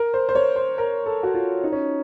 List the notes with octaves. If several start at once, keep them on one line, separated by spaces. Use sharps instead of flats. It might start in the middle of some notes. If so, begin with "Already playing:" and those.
Already playing: A#4
C5
C5
C#5
C5
A#4
A4
F#4
F4
D#4
C#4